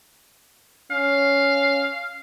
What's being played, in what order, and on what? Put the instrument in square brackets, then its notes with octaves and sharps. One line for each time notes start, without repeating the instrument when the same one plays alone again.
[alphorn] C#4 [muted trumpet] F5